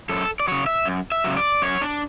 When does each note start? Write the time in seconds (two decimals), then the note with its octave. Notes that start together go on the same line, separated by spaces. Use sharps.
0.09 F#2 A4
0.40 D5
0.48 C#3 F#3 C#5
0.66 E5
0.85 F#2
1.12 E5
1.24 C#3 F#3
1.37 D5
1.62 F#2 C#5
1.82 D4